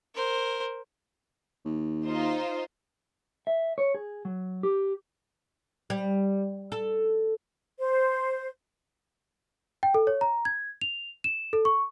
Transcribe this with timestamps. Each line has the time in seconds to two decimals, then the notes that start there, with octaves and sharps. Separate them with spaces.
0.15 A#4 C5
1.65 D#2
2.05 D#4 F4 C5
3.47 E5
3.78 C#5
3.94 G#4
4.25 F#3
4.63 G4
5.90 G3
6.72 A4
7.79 C5
9.83 G5
9.94 A4
10.07 C#5
10.21 A#5
10.45 G#6
10.81 F7
11.24 E7
11.53 A4
11.65 C#6